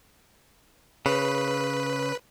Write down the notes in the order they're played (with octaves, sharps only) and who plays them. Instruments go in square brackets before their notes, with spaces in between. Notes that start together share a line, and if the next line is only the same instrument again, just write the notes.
[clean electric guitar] C#3 [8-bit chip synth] B4